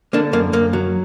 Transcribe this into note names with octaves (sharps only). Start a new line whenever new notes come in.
D3 A#3 D4
F#2 A#3
F#2 A#3
F#3